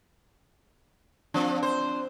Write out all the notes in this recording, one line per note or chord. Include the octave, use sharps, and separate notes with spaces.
F3 C4 D4
C5